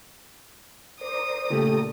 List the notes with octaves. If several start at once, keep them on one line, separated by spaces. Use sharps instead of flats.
A#4 C5 D5 D#6
A#2 C#3 A3 G4 A4 A#4